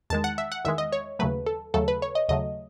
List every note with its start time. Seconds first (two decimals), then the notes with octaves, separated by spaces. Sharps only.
0.10 E2 D#3 G#3 A5
0.24 F#5
0.38 E5
0.52 F#5
0.65 E2 D#3 G#3 E5
0.78 D#5
0.92 C#5
1.19 D#2 C#3 F#3 A3 B4
1.46 A4
1.74 D#2 C#3 F#3 A3 A4
1.88 B4
2.02 C#5
2.15 D#5
2.29 D#2 C#3 F#3 A3 D#5